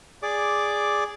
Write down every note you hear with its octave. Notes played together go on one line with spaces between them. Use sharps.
G#4 D5 D6